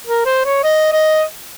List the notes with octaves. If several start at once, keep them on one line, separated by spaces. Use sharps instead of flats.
A#4
C5
C#5
D#5
D#5